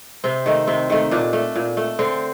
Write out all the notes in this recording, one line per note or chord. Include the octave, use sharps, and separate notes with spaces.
C3 C4
D#3 A3
C3 C4
D#3 A3
A#2 D4
A3
A#2
A3
D3 C4